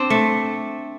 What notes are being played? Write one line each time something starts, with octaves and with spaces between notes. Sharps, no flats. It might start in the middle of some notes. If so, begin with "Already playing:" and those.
Already playing: C4 D4
A3